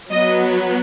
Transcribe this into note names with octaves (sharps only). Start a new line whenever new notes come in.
F#3 B3 D#5